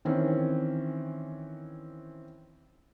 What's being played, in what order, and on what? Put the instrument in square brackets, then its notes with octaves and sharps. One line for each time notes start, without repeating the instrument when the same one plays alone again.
[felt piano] D#3 E3 C4 C#4